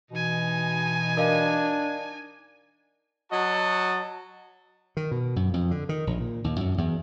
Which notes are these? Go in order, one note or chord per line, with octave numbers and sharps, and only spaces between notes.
B2 E3 D#4 G#5
D4 A#4 D#5 F5
F#3 F#4 D#5 A5
D#3
B2
F#2
F2
D3
D#3
A#1
A#2
D#2
F#2
E2